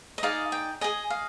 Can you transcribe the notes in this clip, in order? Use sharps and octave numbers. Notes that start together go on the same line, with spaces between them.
D#5
D#4 G#4 D5 F5
G5
G#4 D#5 G#5
F5